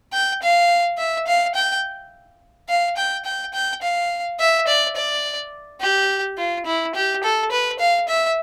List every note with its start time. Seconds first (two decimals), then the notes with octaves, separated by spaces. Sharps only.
0.13 G5
0.42 F5
0.98 E5
1.27 F5
1.55 G5
2.69 F5
2.97 G5
3.25 G5
3.53 G5
3.82 F5
4.40 E5
4.67 D5
4.96 D5
5.81 G4
6.38 F4
6.66 E4
6.95 G4
7.23 A4
7.51 B4
7.79 F5
8.08 E5